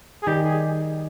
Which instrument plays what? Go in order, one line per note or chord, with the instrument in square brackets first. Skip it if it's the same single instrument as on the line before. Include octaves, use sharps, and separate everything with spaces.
[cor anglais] G#4
[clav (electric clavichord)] D#3 G3 [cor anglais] G4
[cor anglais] G#4